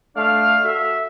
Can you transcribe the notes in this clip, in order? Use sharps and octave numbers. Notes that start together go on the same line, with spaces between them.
A3 D4 F5
F#4 A4 E5